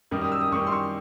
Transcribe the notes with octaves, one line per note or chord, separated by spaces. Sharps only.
F#2 D#3 G3 D#6
D#6
E6
D#6
F#2 D#3 G3 C#6
C6
C#6